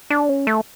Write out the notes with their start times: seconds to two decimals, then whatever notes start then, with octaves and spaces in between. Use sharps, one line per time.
0.10 D4
0.29 C#4
0.47 A3